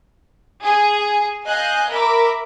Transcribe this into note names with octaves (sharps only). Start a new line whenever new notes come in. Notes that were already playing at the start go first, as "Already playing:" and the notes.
G#4
D#5 F5 G#5 F#6 G6
A#4 E5 B5 D6